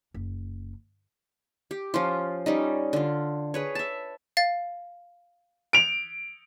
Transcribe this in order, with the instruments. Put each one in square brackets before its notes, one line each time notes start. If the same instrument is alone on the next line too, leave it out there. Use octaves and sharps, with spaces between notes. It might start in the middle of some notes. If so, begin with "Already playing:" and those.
[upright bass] F#1
[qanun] G4
F3 C#4 F4
G3 C#4 D#4
D3 F4
G#4 B4 C#5
E5 A5
[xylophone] F5 A6
[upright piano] D7 F7